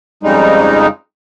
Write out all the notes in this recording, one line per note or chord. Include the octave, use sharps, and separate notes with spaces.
F2 C#3 G3 G#3 D#4